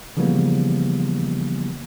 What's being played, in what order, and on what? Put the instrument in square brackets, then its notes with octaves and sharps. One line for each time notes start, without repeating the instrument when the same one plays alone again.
[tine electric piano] C#3 E3 F3 G3 A#3 B3